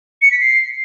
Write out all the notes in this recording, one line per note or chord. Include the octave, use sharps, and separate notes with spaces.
C#7
B6
C7